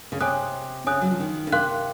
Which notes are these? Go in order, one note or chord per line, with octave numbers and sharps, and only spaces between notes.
C#3
C3 C#5 G#5 D#6 F#6
C#3 C#5 G#5 D#6 F#6
F#3
F3
D#3
C#3
C3 A#4 F5 C6 F#6